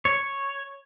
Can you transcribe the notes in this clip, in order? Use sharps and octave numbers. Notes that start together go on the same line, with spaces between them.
C#5